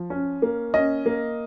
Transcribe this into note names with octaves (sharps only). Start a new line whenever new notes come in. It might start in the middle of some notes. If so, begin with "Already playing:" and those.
Already playing: F3
C#4
A#3
C#4 D#5
A#3